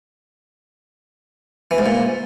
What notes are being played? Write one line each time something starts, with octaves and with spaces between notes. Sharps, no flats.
E3
G#2
A#2